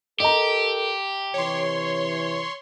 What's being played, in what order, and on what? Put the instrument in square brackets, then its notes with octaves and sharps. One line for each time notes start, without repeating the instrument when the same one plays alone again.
[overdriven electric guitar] G4 [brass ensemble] A4 A#4 [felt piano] D#5 A#5
[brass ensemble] C3 E3 [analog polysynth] C#5 C6